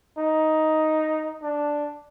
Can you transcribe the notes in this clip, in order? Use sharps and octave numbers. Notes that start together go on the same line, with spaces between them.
D#4
D4